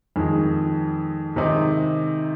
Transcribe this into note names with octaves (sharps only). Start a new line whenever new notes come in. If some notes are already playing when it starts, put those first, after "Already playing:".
F2 D#3 G#3
C3 D#3 G#3 C4 D#4